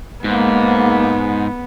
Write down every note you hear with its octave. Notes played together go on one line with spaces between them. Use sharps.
G#2 A#3 B3